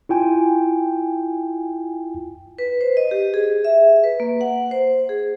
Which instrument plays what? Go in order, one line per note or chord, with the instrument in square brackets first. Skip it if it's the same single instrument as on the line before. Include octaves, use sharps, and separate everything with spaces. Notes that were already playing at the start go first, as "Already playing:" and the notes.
[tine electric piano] E4 F4 G5 G#5
[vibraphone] B4
C5
D#5
G4
G#4
E5
B4
A#3
F#5
C5
G#4